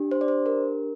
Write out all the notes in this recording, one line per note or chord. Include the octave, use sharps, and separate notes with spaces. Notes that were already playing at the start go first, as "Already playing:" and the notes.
Already playing: D4 G4
C5
D5
C5
A#4